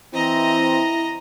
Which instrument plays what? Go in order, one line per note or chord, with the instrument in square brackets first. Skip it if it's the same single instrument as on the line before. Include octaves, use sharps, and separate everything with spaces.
[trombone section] E3 C4 [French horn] E4 [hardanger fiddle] D#5 A#5